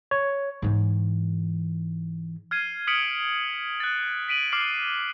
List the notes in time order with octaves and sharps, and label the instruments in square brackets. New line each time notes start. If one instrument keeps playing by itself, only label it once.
[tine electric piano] C#5
[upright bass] G#2 E3
[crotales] F6 G#6 C7 D#7
D#6 F6 B6 C#7 D7 F#7
F#6 A6
B6 D7 D#7 F#7
D6 F6 C7 F#7